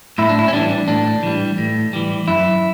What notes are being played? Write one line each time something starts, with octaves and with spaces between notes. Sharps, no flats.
A2 E4
D4
E4
C#4
E3 G3 D4
A2 D4
E3 G3
A2
E3 G3
F#2 E4